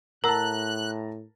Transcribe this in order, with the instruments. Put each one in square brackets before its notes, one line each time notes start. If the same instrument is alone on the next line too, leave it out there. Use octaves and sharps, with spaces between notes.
[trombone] A2 [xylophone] A#4 F#5 E6 [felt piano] A5 A#5 [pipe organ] F#6